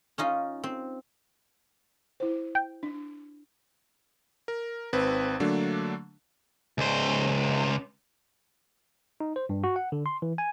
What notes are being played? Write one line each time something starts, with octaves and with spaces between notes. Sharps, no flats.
C#4 D#4 F4 D#5
C4
E4 C5
G5
D4
A#4
G#1 C4 B4
D3 F#3 A3 A#3 D4
C#2 C5
D#4
C5
G2
F#4
F#5
D3
C6
E3
G#5